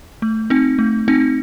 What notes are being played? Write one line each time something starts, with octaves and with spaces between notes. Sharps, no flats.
A3
C4 D#4
A3
C4 D#4